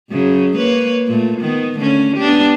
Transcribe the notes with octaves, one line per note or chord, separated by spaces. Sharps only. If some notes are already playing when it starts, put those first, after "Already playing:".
F#2 C#3 F#3
A#3 B4 C#5
A#2 A3
D#3 B3
D3 A3 C#4
B3 D4 G4